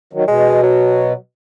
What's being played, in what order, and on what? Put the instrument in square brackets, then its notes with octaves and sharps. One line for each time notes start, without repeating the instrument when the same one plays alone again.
[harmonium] D#3 F#3
[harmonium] B2 [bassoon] G#3
[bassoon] F#3